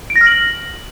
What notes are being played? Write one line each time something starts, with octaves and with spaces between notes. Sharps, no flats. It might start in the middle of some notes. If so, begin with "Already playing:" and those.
D7
A#6
F6
F#7